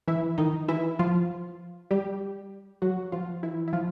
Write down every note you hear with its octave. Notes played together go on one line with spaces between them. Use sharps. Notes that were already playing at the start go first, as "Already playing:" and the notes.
E3 E4
D#3 D#4
E3 E4
F3 F4
G3 G4
F#3 F#4
F3 F4
E3 E4
E4
F3 F4